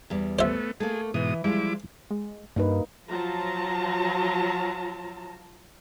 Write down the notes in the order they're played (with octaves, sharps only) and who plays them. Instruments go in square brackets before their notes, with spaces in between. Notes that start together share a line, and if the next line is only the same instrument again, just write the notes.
[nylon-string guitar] E2 G3
[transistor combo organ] A3 B3 [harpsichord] C5 E5
[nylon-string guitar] A3 A#3 [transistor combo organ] G#4
[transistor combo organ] G#2 B2 D#6 [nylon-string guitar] E3
[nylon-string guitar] F3 G3 G#3 [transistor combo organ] E4 D6
[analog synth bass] G#3
[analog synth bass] G2 [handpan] A#3 D#4 B4
[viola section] F3 F#3 F4 A5 A#5